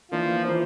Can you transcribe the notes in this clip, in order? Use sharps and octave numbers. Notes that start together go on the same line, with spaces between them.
E3 F3 A#3 D4
E3 A#3 F4 C5